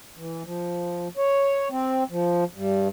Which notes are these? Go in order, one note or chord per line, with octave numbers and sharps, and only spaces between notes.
E3
F3
C#5
C4
F3
G2